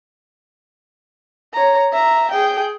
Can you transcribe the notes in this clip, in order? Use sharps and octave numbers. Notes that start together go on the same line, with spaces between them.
C#5 A#5
E5 A#5
G#4 G5